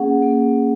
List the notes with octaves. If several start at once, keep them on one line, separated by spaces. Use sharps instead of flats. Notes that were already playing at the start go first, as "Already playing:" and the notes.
Already playing: A#3 C#4 G#4 F#5
A#3